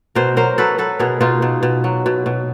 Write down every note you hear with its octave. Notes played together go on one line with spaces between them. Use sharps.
B2 A#4 C5
F#3 A#4 C5
F#3 A4 B4
F#3 A4 B4
B2 G#4 A#4
B2 D#4 F4
B2
B2
F#3
B2
B2